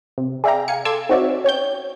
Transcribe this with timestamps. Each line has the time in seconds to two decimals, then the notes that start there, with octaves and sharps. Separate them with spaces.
0.18 C3
0.44 G#4 D5 E5 F5 G5 A#5
0.68 F5 G#5 C#7
0.85 A4 A5 C6 D6 E6 G#6
1.09 C4 D#4 F#4 C#5 D5 E5
1.45 C#4 C#5 G5 G6